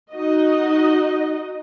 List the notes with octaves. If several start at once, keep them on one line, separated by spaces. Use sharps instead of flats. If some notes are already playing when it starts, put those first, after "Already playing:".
D#4 F#4 D#5